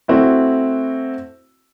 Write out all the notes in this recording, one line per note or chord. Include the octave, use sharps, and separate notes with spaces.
A3 C4 E4 F#4